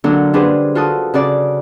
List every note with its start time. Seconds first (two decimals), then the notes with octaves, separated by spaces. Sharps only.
0.04 D3 F#3 A#3 D4 A4
0.33 G3 D4 G#4 B4 C5
0.75 F4 F#4 A4 A5 D#6
1.14 C#3 F#4 D5